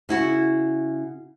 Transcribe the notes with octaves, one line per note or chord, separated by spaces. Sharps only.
C#3 E4 F#4